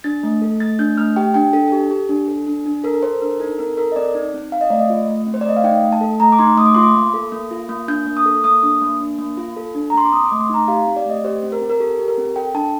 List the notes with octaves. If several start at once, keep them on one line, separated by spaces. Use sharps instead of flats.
D4 A6
A3
A4
A3 A6
D4 G6
A3 F6
G4 G5
D4 G5
D4 A4
G4 A4
G4
D4
A4
D4
D4
A4 A#4
A#4
A4 C5
D4 A#4
D#4 A4
C4 A#4
A4 A#4
D#5
C4 D5
D#4
C4
C4 F5
D#5
A3 D5
D#5
F4
A3
C4
C5
D5
A3 D#5
F5
D#4 G5
A3
A5
A4
A3 A#5
D6
D#4 C6
A3 D#6
D6
F4 C6
D6
A#3
A4
A#3
F4
A#3
D4 G6
A#3
D#6
A4
A#3 D#6
D4
A#3
D4
A#3
F4
A4
D4
A#5
A#3 C6
D6
C4 D#6
D6
A3
C6
D#4 A#5
G4 F5
C4
D5
A3 D#5
G4 C5
C4
A#4
C4
A#4
G4 A4
G4
A#4
C4
A4 G5
D4 A5